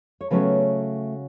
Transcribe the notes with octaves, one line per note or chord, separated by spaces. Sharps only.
C#5
C#3 F#3 A3 B3 C#4 B4